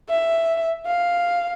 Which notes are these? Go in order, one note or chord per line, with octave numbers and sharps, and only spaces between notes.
E5
F5